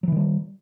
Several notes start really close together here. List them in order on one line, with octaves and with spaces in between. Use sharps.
F#3 E3 D#3 G3